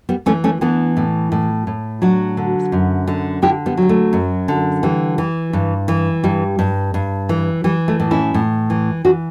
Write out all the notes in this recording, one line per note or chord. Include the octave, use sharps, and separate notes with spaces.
G3 B3
E3 A3 C#4
A3 C#4
E3 B3 D4
A2
A2
A2
F#3 D4 F#4
D3
F#2
D3
D3 E4 G4
G3 B3
F#3 G3
A3
F#2
D3
E3 G3
E3
G2
E3
G2 G3
G2
G2
E3
E3 G3
A3
A2
C#4 E4
A2
E3
E3 D4 F#4